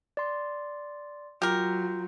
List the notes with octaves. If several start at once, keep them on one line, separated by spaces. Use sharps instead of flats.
D5 C6
F#3 F4 G4 A#4 G6